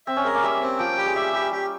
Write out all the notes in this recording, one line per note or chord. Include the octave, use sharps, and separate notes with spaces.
C4 E5
C#4
G#3 A#4
A#3
G3 E5
C4
F3 G5
G3 G4
G#3
G3 E5
G3 G4
G3 G4